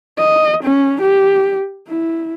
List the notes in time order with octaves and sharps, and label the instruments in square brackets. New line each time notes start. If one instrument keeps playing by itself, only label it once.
[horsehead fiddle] D#5
C#4
G4
E4